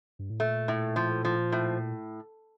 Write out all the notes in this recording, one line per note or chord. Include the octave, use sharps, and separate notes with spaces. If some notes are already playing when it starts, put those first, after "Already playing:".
G2
A2
A#2 A3
A2
F3
F3
A2